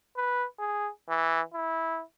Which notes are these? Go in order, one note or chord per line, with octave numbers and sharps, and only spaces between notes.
B4
G#4
E3
E4